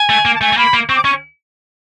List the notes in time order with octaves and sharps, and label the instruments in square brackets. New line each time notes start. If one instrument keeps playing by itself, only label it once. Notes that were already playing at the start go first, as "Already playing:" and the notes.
Already playing: [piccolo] G#5
[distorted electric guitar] A3
A#3
[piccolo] A5
[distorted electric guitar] A3 [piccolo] G#5
[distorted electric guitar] A3
[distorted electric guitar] A#3 [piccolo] B5
[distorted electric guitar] A#3
[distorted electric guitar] C4 [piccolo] C#6
[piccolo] D6
[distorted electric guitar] C#4 [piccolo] C#6